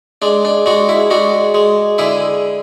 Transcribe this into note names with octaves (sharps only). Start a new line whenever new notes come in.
G#3 D4
D4
G#3 D4 F#4
E4
G#3 D4 F#4
G#3
D3 E4 G#4